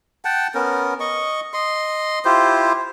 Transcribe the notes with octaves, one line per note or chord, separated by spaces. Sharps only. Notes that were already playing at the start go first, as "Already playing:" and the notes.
F#5 G5 A5
B3 C#4 A#4
D#5 C#6
D#5 C6
E4 F4 G4 C5